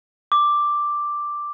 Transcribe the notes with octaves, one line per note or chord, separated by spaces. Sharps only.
D6